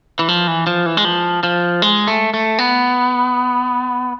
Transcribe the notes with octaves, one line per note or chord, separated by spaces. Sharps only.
E3
F3
E3
F3
E3
G#3
F3
F3
G#3
A3
A3
B3